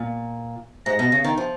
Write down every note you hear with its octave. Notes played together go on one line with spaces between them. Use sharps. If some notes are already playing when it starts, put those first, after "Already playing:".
Already playing: A#2
G#2 A#6
B2
C#3
D#3
F3